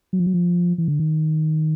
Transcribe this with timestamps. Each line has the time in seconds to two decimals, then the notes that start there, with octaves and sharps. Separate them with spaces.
0.13 F#3
0.19 F3
0.26 F#3
0.34 F3
0.78 E3
0.88 D3
0.99 D#3